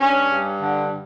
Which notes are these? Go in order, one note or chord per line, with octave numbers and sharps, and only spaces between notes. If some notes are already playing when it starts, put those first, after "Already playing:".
G2 C#4
G2
D3